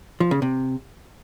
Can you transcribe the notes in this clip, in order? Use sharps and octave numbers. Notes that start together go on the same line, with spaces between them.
F3
C#3
C3